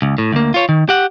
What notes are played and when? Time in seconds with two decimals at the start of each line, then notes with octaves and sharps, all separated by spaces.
0.02 C#2
0.18 A2
0.33 D2 A#3
0.54 F4 C#5
0.69 D#3
0.89 G4 F#5